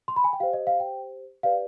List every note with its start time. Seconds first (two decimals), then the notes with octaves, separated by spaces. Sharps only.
0.08 C6
0.16 B5
0.24 G#5
0.33 G5
0.40 G4 C5 F5
0.53 D#5
0.67 F5
0.80 G5
1.43 G4 B4 D5 F5